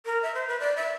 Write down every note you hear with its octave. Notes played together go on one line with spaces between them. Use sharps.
A#4
E5
C5
B4
D5
E5